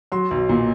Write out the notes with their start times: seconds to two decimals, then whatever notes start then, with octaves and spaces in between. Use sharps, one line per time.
0.12 F#3 C6
0.31 B1
0.49 A#2